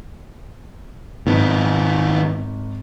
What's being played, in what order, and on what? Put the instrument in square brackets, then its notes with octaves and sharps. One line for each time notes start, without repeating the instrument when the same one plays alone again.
[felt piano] G#1 [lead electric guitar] D#3 B3